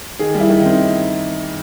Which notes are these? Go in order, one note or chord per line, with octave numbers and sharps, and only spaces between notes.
D#3 G#4
G3
E4
D#3
D#4
C4